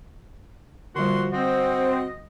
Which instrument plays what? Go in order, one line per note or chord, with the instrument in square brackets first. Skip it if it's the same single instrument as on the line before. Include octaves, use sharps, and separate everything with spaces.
[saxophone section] A#2 F3 F#4 [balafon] D3 G3 [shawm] C6
[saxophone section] C4 [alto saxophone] F#4 [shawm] D#5